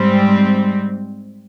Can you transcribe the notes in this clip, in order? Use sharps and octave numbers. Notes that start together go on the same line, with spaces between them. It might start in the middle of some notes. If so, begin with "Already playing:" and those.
Already playing: G#2 G3 C4